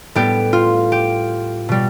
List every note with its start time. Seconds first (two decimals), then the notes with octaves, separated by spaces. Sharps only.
0.15 A2 G3 B3 G4
0.53 F4
0.92 G4
1.69 B2 G3